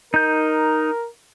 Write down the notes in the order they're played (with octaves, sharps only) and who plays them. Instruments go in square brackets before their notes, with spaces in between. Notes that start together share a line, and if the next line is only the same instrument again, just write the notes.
[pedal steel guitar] D#4 G6 [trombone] A#4